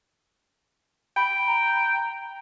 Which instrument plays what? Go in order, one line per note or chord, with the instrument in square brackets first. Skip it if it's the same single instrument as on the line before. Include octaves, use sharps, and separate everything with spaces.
[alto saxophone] G5 [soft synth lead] B5
[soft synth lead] A#5